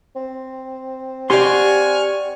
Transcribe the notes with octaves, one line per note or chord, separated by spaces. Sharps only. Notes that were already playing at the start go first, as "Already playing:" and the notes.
C4
G4 D5 F#5 G#5 C6 C#6 F6